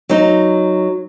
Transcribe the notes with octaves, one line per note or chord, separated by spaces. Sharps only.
F#3 D#4